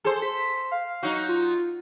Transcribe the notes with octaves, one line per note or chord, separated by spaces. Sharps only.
G#4 A4 C5
B6
F5
F#3 D#4 F#4
F4